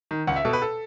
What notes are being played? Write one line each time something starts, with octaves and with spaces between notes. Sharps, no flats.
D#3
C#2 F#5
E5
B2 A4
B4
A4